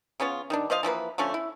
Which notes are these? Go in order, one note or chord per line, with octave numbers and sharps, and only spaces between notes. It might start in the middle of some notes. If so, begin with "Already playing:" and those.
C#3 B3 C#4 F4
D#3 G3 D4
F3 C5 D#5 F5
E3 F3 A#3 B4
D3 F3 A3 C#4
E4